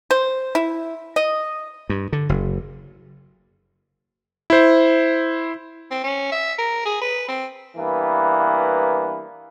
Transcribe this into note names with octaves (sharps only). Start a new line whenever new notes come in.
C5
E4
D#5
G2
D3
F#1
E4 C5
C4
C#4
E5
A#4
G#4
B4
C4
G2 E3 A#3 B3 B4